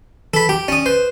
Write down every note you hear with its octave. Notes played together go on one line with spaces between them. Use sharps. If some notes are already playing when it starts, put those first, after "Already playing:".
E3 A4 B5
G4 G5
C#4 D5 D#6
B4 C5